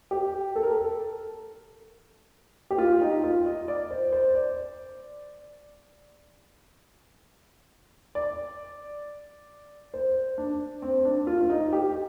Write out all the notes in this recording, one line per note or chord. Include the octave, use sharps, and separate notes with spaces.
G4
A4
A#4
A4
G4
F4
D#4
F4
D#5
D5
C5
C5
D5
D5
C5
D4
C4
D4
F4
F4
D#4
G4